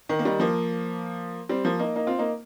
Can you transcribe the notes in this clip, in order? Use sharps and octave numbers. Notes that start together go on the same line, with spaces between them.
D#3
A#3
D#3 G3
F3 A#3
G3 C4
F3 A#3
A#3 D#4
A#3 D#4
C4 F4
A#3 D#4